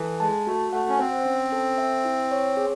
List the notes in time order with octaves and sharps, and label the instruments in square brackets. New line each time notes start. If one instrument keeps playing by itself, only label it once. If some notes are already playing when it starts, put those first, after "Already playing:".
Already playing: [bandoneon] E3 [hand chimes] A4
[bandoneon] G#3 [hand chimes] A5
[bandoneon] A3 [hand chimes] F#4
[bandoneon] A3 [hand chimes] F#5
[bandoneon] C#4
[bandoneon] C4 [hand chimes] C5
[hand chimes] C#4
A4
E5
E4
C#5
G#4